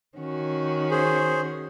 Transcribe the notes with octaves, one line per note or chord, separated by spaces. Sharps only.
D#3 C#4 F#4
G#4 C5